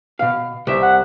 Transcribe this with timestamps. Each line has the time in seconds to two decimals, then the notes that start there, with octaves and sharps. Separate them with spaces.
0.19 B2 F5
0.67 C2 E5
0.83 F#5